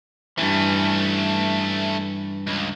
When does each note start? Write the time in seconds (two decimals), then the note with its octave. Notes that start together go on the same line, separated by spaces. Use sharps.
0.38 G2 E3 A3 C#4
2.47 C#2